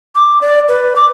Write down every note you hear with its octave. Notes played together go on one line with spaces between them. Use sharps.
D6
D5
B4
D6